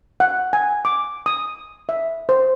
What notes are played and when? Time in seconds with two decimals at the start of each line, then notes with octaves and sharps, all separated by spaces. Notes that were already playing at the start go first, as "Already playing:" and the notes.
0.20 F#5
0.53 G#5
0.85 D6
1.26 D#6
1.89 E5
2.29 C5